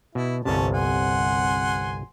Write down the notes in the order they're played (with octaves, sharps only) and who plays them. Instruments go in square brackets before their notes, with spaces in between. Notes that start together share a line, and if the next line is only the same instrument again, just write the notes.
[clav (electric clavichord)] B2 [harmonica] E4
[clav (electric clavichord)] G1 C2 C3 [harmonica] C#4 A5
[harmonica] F#5 G#5 C6